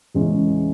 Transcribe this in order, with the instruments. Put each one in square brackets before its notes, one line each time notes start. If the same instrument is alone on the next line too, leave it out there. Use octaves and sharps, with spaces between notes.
[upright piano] E2 C#3 E3 G#3 C#4